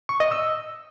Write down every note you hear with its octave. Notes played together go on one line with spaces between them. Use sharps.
C#6
D#5
E6